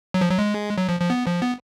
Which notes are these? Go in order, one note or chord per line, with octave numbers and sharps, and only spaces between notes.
F#3
F3
F#3
G#3
F#3
F3
F3
B3
F3
B3